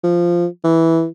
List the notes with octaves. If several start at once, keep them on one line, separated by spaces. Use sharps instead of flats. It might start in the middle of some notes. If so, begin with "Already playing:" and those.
F3
E3